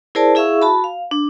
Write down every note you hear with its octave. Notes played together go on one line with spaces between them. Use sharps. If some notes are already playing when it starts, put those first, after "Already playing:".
E4 G#4 A#4 C5 D5 A5
E4 G#4 E5 F5 C#6 E6
F#4 A5 B5
F5
D4